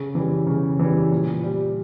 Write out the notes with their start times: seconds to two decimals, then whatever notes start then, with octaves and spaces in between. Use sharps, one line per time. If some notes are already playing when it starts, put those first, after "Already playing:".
Already playing: C#3
0.15 E3 G3
0.47 C#3
0.79 E3 G3
1.12 A#2
1.44 G3